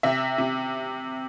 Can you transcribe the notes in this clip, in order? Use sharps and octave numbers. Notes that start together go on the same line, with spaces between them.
C3 E5
C3